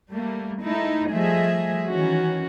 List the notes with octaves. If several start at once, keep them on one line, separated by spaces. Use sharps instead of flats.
G3 A3 A#3
G#3 A3 D#4 E4
F3 G3 A3 G#4 D#5 E5
D#3 E3 C#4 F#4